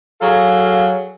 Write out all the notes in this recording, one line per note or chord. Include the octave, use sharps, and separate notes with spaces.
F#3 G#4 A4 F5